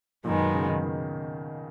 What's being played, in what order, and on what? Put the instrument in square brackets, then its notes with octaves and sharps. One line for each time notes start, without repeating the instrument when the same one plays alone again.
[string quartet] F#2 D#3 G#3 B3 [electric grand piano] A#2
[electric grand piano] B2
C#3
D#3
D#3